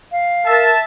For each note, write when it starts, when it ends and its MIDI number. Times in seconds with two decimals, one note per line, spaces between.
0.12 0.63 77
0.46 0.73 70
0.46 0.84 76
0.46 0.84 81